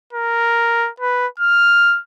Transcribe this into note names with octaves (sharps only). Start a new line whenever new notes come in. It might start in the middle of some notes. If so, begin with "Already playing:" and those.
A#4
B4
F6